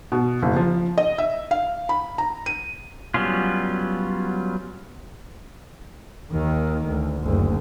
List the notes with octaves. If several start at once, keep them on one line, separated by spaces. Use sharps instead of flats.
B2
F#1
F3
D#5
E5
F5
B5
A#5
D#7
F#3 G3 B3 C#4 F4
D#2 D#3
D2
F#1 D2